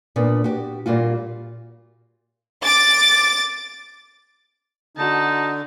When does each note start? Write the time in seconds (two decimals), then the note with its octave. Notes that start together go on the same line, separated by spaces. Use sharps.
0.16 A#2 B3 D4
0.44 F#4 G4
0.86 A#2 G3 F4 F#4
2.63 D6 A6
4.97 D3 D#4 F#4 A5